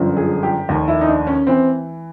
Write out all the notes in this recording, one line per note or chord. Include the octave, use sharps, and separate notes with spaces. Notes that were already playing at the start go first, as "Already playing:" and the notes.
Already playing: G1 F#2 D3 F3
G#4
G4
F1 D#2 D#3
E4
D#4
D4
C#4
E3 C4